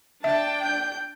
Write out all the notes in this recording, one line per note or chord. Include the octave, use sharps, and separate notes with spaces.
D4 E5 G5 A5
G6